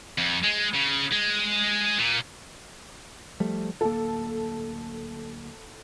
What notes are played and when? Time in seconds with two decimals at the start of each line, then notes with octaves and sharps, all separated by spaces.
0.18 F2
0.44 G#3
0.74 C#3
1.12 G#3
1.98 A#2
3.40 F3 G3 A3
3.81 D1 A#3 A4